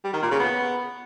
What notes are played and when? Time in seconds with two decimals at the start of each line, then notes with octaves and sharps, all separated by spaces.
0.04 G3
0.13 D#3
0.22 A#2
0.31 C#3
0.40 B3